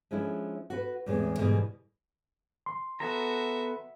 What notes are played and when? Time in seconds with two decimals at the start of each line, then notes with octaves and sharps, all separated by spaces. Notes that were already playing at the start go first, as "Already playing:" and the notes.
0.11 F3 G#3 C#4 D4 E4
0.70 F#4 B4
1.06 E2 A2 C3 G#3
1.39 G#2 B2 D3 E3 G3 G#3
2.66 C6
3.00 B3 F#4 A4 E5 A#5